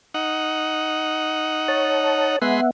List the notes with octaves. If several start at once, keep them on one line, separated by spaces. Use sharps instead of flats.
D#4 F#5
C#5 A5
G#3 B3 E5 F#5 B5 C6